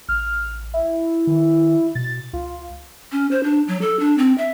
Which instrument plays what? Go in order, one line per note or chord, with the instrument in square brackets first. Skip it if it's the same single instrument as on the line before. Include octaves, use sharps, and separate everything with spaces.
[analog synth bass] A1 [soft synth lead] F6
[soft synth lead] E4
[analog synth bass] D#3
[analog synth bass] B2 [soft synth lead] A6
[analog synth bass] C#2 [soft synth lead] F4
[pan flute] C#4
C5
D4
F#3
A4
D4
C4
E5